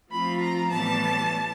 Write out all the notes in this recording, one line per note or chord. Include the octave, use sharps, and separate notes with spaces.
F3 A3 C4 F4 B5
A#5
A2 E3 G3 B3 A5